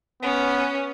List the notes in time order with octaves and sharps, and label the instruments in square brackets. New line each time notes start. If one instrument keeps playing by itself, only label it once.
[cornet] B3 [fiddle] C#4